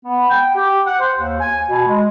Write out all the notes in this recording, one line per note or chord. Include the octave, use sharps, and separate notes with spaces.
B3
G5
G4
F#5
C5
D#2
G#5
B2
G#3